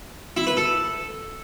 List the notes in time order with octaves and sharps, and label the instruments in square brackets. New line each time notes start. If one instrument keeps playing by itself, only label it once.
[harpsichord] E4
B4
A4